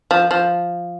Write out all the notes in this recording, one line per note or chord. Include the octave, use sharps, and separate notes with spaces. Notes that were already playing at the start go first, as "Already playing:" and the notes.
F3
F3